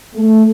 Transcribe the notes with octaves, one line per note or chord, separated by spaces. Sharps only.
A3